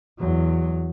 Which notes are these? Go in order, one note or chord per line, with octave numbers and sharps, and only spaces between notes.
E2 F#3